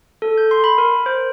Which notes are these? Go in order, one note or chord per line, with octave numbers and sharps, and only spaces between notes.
A4
G6
C6
B5
A#4
C5